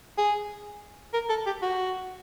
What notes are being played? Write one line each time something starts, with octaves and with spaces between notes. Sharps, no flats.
G#4
A#4
A4
G4
F#4